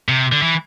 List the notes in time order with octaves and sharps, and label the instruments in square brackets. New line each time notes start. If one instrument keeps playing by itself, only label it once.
[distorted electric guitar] C3
D3
E3